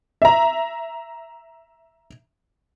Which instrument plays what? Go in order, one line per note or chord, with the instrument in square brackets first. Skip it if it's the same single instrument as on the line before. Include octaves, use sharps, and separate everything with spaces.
[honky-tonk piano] E5 A#5